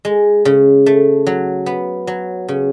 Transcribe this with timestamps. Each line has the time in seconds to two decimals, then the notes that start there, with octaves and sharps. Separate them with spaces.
0.05 G#3
0.45 C#3
0.86 A3
1.27 F#3
1.66 B3
2.07 F#3
2.49 C#3